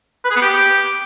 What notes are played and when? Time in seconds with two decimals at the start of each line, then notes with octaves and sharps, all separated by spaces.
0.25 B4
0.30 G#4
0.36 B3
0.42 G4